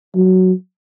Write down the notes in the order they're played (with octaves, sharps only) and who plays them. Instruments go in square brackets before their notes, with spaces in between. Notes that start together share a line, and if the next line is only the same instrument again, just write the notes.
[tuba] F#3